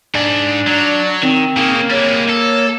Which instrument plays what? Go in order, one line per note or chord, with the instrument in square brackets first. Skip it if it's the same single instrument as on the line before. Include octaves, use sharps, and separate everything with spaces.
[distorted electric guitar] G#2 [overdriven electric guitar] D4
[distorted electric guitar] F#3 [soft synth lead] D5
[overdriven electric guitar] D#3 [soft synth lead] C4
[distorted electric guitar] C#3 [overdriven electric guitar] A#3
[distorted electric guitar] G3 G#3 [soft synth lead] C#5
[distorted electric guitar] A4